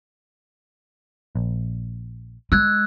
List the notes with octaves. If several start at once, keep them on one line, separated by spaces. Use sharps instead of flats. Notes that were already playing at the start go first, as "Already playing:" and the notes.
A#1
G#3 E6 F#6 G#6